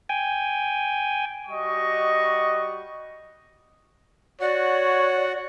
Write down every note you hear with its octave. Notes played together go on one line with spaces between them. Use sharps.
G5 G#5
G3 F#4 D#5 C#6
F#4 C#5 D5 F#5